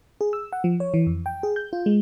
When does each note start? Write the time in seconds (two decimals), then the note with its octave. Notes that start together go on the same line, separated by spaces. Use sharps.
0.21 G#4
0.33 E6
0.53 F#5
0.64 F3
0.80 C#5
0.94 E3
1.07 F2
1.26 G5
1.43 G#4
1.56 G6
1.73 F4
1.86 G#3